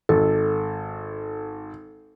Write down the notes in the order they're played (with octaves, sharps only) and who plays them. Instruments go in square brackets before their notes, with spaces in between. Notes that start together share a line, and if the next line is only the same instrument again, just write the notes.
[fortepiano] G#1 [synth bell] A4